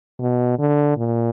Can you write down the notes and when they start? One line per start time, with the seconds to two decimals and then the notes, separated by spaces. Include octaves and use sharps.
0.20 B2
0.59 D3
0.97 A#2